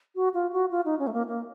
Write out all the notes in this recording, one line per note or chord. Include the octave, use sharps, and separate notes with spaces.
F#4
F4
F#4
F4
D#4
C#4
A3
A#3
A#3